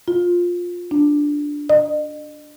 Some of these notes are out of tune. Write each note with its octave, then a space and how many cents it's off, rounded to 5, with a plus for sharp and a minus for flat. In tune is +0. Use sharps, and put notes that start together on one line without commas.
F4 +15
D4 +0
D#5 -45